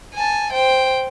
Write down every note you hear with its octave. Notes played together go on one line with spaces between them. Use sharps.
G#5 A5
C5 G5